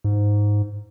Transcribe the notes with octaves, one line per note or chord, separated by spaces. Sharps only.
G#2